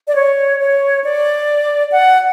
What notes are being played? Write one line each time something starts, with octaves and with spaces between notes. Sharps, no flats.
D5
C#5
C#5
D5
F#5